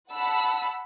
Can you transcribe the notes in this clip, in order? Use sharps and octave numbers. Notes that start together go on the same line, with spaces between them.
F#5 A5 B5 E6